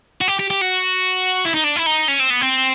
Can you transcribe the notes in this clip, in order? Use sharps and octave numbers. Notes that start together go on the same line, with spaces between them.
F#4
G4
G4
G4
F#4
E4
D#4
D4
E4
D#4
C#4
C4
B3
C4